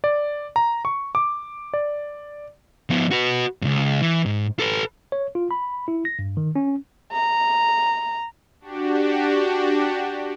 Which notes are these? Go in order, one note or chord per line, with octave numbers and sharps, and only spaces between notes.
D5
A#5
C#6
D6
D5
F3 B3
F#4 B4
C#2 G2
E3
G#2
A4 B4
C#5
F4
B5
E4
A#6
G2
D#3
C#4
A#5
D4 F#4 G4